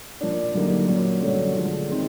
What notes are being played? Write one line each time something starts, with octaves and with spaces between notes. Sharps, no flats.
A#2 F3 A#3 D4
F#2 D3 G3 A#3 D#4
A#2 F#3 A#3 C#4
G2 D3 F#3 A3 C#4
D3 F3 G#3
D#3 G#3 C4 D#4